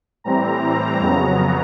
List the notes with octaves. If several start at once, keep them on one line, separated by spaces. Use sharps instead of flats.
A2 E3 G3 C4 A#5
F2 C#3 F#3 B3